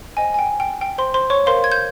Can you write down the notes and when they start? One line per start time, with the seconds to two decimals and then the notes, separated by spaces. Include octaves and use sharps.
0.17 C5 D#5 G5 G#5
0.34 G#5
0.39 G5
0.60 G5
0.81 G5
0.98 C5 C6
1.14 C5 C6
1.30 C#5 C#6
1.46 A#4 C5 C#5 F5 C6
1.64 G#6
1.72 G6